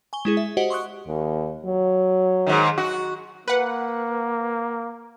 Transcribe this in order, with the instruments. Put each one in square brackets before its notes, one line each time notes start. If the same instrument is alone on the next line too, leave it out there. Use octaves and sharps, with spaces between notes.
[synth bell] G#5 C#6 G7
G#3 E4 G#4
E5
F#4 G4 C5 D#5 F#5
C6 C#6 D#6 F#6
[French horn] D#2
F#3
[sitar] G#2 D#3
F#4
[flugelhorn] A#3 [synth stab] B4 F#5